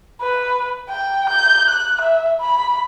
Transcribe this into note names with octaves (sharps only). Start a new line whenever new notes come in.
B4
G5
G6
F#6
E5
B5